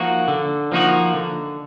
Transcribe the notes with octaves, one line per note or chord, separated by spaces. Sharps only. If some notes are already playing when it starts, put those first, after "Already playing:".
Already playing: F3 A#3 D#4 F#4
D3
F3 A#3 D#4 F#4
D3